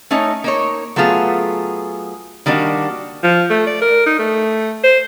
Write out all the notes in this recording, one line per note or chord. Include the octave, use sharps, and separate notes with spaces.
A3 C#4 D#4 C#5
A#3 D#4 C#5
F#3 A3 B3 F4 G#4
D#3 G3 A#3 D4 F#4
F3
A3
D5
A#4
D#4
A3
C5